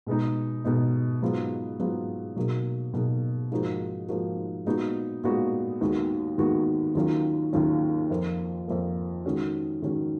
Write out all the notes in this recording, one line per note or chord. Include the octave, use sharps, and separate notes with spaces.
B2 G#3 B3 D#4
B2 G#3 B3 D#4
G#2 F#3 B3 F4
G#2 F#3 B3 F4
B2 F#3 A#3 D#4 G#4
B2 F#3 A#3 D#4 G#4
G#2 F3 A#3 D#4 F#4
G#2 F3 A#3 D#4 F#4
A#2 G#3 B3 D#4 F#4
A#2 G#3 B3 D#4 F#4
D#2 D#3 G#3 B3 F#4
D#2 D#3 G#3 B3 F#4
D#2 D#3 F#3 C#4 F4
D#2 D#3 F#3 C#4 F4
F2 F3 A#3
F2 F3 A#3
D#3 G#3 C#4 F#4
D#3 G#3 C#4 F#4